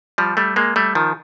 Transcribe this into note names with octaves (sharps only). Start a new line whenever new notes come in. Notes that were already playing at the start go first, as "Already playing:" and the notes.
F3 G3
G3 A3
G#3 A#3
G3 A3
D#3 F3